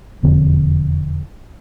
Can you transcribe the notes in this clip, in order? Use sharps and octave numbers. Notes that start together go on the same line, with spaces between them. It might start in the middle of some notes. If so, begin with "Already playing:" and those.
E1 F2 D3 C4